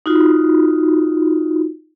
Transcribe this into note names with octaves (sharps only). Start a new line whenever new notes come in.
D#4 F4 F#4